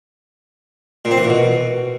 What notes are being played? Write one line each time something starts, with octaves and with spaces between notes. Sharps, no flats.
A#2
C4
E3
A#2
B2